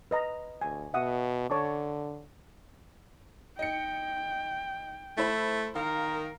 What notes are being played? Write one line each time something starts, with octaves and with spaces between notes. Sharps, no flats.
B4 D#5 A#5
D2 G#5
B2 E5 F#5 D#6
D3 C#5 A5 D6
D#4 G5 C#7
A3 E4 C5 B5
D#3 A#4 F5